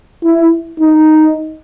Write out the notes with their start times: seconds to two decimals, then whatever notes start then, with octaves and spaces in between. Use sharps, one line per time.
0.24 E4
0.80 D#4